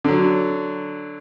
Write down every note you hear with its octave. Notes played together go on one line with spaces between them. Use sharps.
D3 F#3